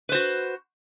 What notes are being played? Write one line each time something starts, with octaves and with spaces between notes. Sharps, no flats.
F#4 B4 C5